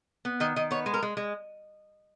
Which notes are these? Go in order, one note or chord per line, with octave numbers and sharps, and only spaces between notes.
B3
D#3 D#5
D#3 D#5
B3 C#5
G#3
A#4
G#3
G#3